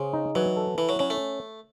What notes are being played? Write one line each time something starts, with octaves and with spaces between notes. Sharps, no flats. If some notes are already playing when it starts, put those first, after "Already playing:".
Already playing: C#3 G#4 C5
D#4
E3 F#3
A4
E3 E4
F#3
F#3 C#4
A3